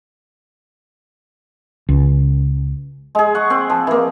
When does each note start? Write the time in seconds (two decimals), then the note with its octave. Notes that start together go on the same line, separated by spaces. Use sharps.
1.89 C#2
3.15 G#3 G#4
3.35 F#5 C#6
3.50 C4
3.70 F3
3.87 E3 A#3